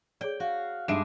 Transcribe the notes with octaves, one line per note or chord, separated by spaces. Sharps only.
G#4 C#5 D5 G5
F#4 F5
G2 G#3 E5 D6 D7 E7